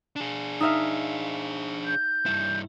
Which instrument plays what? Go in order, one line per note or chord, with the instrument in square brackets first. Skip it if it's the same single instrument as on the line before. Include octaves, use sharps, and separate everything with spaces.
[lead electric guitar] D4 G#4
[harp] D#4 E5 F5
[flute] G6
[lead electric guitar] G2 E4